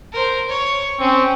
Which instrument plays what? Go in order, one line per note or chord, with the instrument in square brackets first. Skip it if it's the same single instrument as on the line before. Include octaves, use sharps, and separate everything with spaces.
[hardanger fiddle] A#4 C5
C#5
[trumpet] C4 [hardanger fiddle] C#4